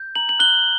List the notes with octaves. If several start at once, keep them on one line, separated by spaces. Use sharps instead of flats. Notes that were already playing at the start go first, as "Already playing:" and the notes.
Already playing: G6
A#5 F#7
F#7
F#6 G7